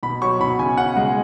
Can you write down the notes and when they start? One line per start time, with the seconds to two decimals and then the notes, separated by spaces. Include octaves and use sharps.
0.03 B2 B5
0.22 F#3 C#6
0.40 B2 B5
0.59 C#3 G#5
0.78 C#3 F#5
0.97 G#3 F#5